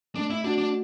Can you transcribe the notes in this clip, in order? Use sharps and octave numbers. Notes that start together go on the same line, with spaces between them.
A3 D4
E4
D4 F#4
D4